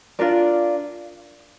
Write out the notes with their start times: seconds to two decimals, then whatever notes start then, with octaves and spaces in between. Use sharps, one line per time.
0.19 D4 F4 A#4 D5